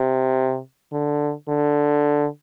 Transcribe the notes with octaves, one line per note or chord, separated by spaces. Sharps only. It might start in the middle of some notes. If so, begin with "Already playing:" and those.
Already playing: C3
D3
D3